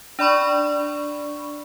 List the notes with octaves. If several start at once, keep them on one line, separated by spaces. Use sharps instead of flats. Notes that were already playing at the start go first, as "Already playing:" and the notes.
D4 D5 B5 C#6